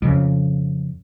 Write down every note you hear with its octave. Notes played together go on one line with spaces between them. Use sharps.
F2 C#3